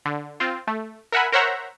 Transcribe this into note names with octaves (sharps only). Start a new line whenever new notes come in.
D3
C4 F4
A3
A#4 E5 F#5 G#5 B5
A#4 C5 C#5 E5 F#5 A#5